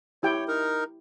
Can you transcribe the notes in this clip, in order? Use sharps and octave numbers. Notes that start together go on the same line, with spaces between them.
E4 G4 C#5 G5
D#4 A#4